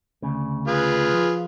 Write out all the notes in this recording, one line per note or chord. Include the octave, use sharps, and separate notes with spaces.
D2 C#3
F4 G#4 B4
F3